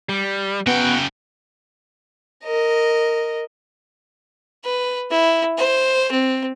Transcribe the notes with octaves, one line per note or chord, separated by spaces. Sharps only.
G3
C#3 B3 F#4 G5
A#4 D#5
B4
E4
C5
C4